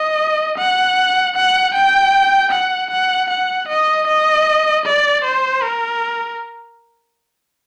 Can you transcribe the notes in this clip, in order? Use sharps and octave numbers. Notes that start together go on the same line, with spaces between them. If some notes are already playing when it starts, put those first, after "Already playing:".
Already playing: D#5
F#5
F#5
G5
F#5
F#5
F#5
D#5
D#5
D5
C5
A#4